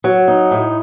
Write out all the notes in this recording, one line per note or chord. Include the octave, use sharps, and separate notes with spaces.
F#3
D#4
A2